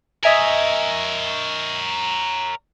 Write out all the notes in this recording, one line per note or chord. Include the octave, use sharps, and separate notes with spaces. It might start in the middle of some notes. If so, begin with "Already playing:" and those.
A#4 C#5 D#5 E5 G#5